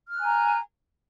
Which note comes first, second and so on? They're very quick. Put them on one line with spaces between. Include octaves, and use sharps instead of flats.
F6 F#6 G#5 A#5